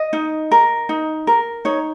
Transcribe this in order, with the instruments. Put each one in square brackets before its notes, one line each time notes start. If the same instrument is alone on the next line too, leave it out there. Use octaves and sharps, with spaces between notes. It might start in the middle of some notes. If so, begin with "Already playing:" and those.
Already playing: [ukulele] D#5
D#4
A#4
D#4
A#4
D#4 C#5